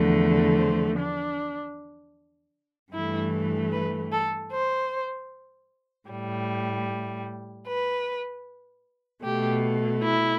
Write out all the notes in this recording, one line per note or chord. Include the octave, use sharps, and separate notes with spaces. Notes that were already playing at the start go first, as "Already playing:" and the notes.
Already playing: E2 D3 F3 A3
C5
D4
G2 E3 A3 E4
B4
A4
C5
A2 G3
B4
B2 A3 G4
E4